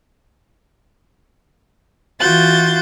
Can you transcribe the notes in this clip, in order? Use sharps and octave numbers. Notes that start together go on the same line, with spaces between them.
E3 F4 F#4 G6 A6